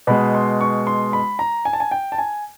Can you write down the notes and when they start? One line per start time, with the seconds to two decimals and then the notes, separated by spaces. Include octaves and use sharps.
0.07 B2 G#3 B5
0.34 C6
0.61 C#6
0.87 C6
1.13 B5
1.39 A#5
1.65 G#5
1.73 A5
1.80 G#5
1.91 G5
2.12 A5
2.18 G#5